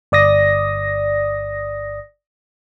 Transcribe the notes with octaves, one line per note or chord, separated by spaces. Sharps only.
G1 D5 D#6 A#6